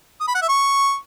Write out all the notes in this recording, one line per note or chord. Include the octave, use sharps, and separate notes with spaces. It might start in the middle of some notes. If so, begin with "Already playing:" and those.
D#6
B5
F#5
E5
C#6